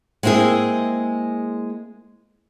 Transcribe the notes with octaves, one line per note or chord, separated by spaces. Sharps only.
G#3 A#3 C4 E4 G#4